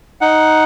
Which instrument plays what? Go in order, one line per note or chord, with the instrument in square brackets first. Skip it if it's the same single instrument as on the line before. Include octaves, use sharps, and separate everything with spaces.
[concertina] D#4 F#5